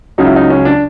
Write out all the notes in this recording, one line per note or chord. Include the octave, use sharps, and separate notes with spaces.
C#2 C#3 F#3 D#4
E4
D#4
C#4
D4